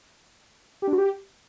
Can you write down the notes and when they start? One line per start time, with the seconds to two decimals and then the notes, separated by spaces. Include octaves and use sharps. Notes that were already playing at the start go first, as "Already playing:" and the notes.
0.82 G4
0.87 D4
0.93 F#4
0.98 G4